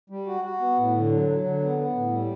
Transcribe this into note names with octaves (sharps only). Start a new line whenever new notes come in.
G3
F#4
F#4
B3
A2
D3
F#3
F#3
D3
B3
B3
A2
G3